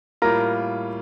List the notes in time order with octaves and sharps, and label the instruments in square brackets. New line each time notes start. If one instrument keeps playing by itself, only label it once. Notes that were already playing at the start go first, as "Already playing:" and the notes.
[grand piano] A2 G3 A#3 F4 [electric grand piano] A#4 A#5